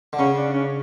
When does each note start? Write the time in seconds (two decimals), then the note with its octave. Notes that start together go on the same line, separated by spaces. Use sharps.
0.13 D3
0.19 C#3 C#4
0.36 D4
0.53 C#4